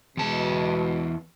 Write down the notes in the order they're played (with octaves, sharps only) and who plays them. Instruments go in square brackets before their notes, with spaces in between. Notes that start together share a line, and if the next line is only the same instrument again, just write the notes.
[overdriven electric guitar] E2 A5 [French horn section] B2 G#3